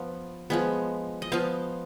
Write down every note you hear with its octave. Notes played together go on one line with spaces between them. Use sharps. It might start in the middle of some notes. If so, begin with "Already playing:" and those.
Already playing: F3 B3
F3 G#3 B3
D#5
F3 B3 F5